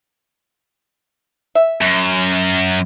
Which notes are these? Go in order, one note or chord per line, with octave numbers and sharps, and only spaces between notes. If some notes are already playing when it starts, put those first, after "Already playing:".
E5
F#2